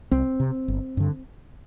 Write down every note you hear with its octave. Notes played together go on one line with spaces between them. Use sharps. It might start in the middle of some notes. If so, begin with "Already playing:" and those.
C2 C4
C3
G1
G2 D3